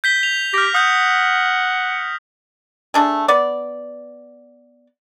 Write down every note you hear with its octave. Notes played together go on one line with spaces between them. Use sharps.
G6 B6 G7
F7
G4 F6 A#6
F#5 D#6 G6
A3 D4 G#4
B3 D5